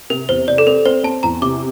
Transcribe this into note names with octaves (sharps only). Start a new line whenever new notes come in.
C3 A#4
E2 C5
C3 D5
A4
C4 A#4
C4 C5
C4 A5
E2 A#5
C3 D6